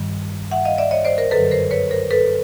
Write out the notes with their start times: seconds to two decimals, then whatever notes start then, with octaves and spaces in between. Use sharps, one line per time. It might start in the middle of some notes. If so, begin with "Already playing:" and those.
Already playing: G2 D#3 G3
0.51 E5 F#5
0.65 D#5 F5
0.78 D5 E5
0.91 C#5 D#5
1.05 C5 D5
1.18 A#4 C5
1.31 F#2 D3 F#3 A4 B4
1.51 A#4 C5
1.71 B4 C#5
1.91 A#4 C5
2.11 A4 B4